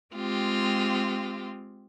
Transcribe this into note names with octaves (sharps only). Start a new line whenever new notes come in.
G#3 C4 F4 G4